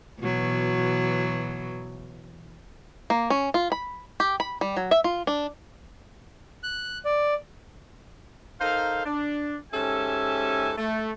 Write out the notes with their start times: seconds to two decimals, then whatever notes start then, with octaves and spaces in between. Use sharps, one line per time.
0.20 B2 E3 F#3
3.10 A#3
3.30 C#4
3.54 F4
3.72 B5
4.20 G4
4.40 B5
4.61 G3
4.77 F#3
4.91 E5
5.04 F4
5.27 D4
6.63 F#6
7.05 D5
8.61 D#4 A4 A#4 C5 F5
9.06 D4
9.73 G#2 C#4 G4 A4 E5 G#5
10.78 A3